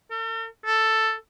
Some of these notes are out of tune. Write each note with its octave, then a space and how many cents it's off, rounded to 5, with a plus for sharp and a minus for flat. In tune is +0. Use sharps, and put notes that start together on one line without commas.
A4 +45
A4 +5